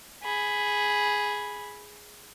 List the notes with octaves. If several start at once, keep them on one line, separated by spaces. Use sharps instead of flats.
G#4 B5